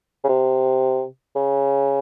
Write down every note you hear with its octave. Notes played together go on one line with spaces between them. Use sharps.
C#3
C3
C#3